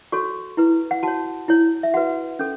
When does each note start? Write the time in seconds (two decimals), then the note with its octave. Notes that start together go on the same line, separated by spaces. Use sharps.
0.12 F#4 A4 C#5 C#6
0.57 E4 B4
0.91 F#5
1.03 F#4 C#5 A5
1.48 E4 C#5
1.83 E5
1.94 F#4 B4 F#5
2.39 C#4 A4